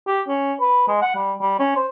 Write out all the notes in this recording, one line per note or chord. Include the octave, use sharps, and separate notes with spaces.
G4
C#4
B4
G#3
F#5
G3
G3
C#4
C5